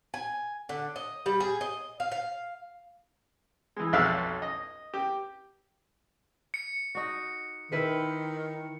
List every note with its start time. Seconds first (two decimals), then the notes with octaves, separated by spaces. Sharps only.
0.14 G#5
0.69 D3
0.96 D#5
1.26 G3
1.40 G#4
1.61 D#5
2.00 F5
2.12 F5
3.76 E3 G#3
3.93 B1 F2 E5 F5 E6 F#6
4.42 D#5
4.94 G4
6.54 C#7
6.95 D#4 F#4
7.72 D#3 E4 B4 C5